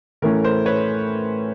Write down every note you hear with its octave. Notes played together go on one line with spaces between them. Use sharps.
A2 E3 A3 C#4 A#4
A#4 C5
B4 C#5